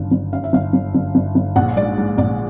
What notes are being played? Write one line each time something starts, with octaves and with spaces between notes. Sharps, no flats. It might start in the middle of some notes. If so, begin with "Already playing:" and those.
Already playing: G1 F#2 D#3 F5
G1
F#2 F5
E5
G1 F5
G1
G1
G1
G1
A#1 F#5
G#2 D5
G#2
A#1 D5